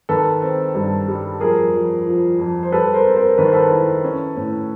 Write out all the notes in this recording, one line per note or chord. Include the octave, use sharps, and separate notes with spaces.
D#3 A4 B4
C4
G2
G3
F2 G#4 A#4
F2
F3
F2
C5
G3 A4 B4
A#4 C5
C4
A#4 C5
D#3 B4
C5
A4 B4
E4
C#4
A2